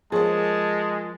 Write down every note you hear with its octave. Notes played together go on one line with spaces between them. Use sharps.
F3 G#3 A#3 G#4 C#5 A5